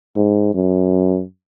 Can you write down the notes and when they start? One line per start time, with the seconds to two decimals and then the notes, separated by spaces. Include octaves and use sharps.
0.16 G#2
0.54 F#2